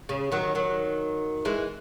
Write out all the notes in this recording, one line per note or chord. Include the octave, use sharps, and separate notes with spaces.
C#3
D#3 F#3
D#3 F#3
E3 G#3